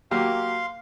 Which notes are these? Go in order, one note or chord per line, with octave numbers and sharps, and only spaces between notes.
F#3 A#3 G4 F5 C6